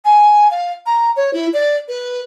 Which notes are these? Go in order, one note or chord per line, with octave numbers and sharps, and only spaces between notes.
G#5
F5
A#5
C#5
E4
D5
B4